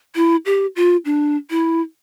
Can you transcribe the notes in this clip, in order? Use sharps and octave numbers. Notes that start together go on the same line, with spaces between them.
E4
G4
F4
D4
E4